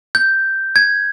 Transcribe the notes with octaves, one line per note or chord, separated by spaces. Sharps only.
G6
G#6